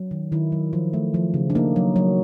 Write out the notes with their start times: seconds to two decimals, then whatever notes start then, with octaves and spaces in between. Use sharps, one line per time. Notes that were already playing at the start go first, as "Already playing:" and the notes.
Already playing: F#3
0.11 D#3
0.32 D#3 E4
0.52 F#3
0.73 F3
0.93 A3
1.14 F3
1.34 C#3
1.50 D4
1.55 A#3 D#4
1.76 F#3
1.96 F#3